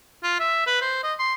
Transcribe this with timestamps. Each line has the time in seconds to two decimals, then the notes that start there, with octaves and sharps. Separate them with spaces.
0.23 F4
0.40 E5
0.67 B4
0.81 C5
1.03 D#5
1.19 C6